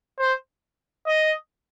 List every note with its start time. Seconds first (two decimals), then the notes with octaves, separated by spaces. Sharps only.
0.19 C5
1.07 D#5